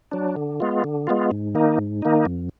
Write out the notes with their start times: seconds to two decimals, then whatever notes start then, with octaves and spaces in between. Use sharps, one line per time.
0.11 F#3 D4
0.36 D3
0.60 G#3 B3 F4
0.84 D3
1.07 G#3 B3 F4
1.31 G#2
1.55 D#3 A#3 D#4
1.78 G#2
2.02 D#3 A#3 D#4
2.25 F2